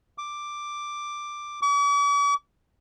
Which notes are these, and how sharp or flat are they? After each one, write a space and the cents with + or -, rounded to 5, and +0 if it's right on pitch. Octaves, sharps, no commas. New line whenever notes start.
D6 +5
D6 -45